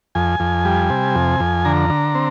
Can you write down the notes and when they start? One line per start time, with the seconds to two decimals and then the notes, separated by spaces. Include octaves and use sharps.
0.15 F2 G#5
0.40 F2
0.65 G3
0.90 C3
1.15 F2
1.40 F2
1.65 D3 A#5
1.90 D3
2.15 C4